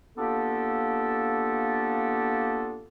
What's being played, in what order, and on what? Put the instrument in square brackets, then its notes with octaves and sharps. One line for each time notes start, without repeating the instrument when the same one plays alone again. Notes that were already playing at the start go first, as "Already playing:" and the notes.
[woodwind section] A#3 B3 D4 F4 G4 A4